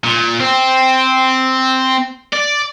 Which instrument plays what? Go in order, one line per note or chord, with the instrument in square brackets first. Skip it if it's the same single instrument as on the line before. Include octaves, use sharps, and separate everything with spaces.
[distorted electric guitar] A#2
C4
D5